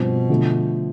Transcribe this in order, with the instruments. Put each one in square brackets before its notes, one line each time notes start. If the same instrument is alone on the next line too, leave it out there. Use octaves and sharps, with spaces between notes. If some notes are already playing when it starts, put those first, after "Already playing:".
Already playing: [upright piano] G2 F3 C4 [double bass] B2
[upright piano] D3 F3 A3